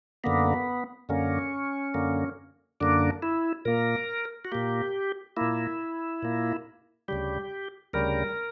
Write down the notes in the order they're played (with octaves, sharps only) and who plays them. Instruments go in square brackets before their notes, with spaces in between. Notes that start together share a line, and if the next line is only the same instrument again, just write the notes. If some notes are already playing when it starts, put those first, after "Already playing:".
[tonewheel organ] F#2 D3 A#3 B3
F#2 D3 A#3 C#4
F#2 D3 A#3
F#2 D3 A#3 D4
E4
A#2 A#3 A#4
F#4
A#2 A#3 G4
A#2 A#3 E4
A#2 A#3
D2 C#3 G3 G4
D2 C#3 G3 A#4